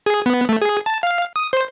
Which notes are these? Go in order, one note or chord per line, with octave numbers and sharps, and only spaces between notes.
G#4
B3
A3
G#4
A5
F5
D#6
C5